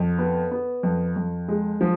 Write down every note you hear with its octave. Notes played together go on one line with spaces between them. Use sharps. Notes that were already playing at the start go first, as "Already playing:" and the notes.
Already playing: F2
B3
B3
F2
F2
G#3
F3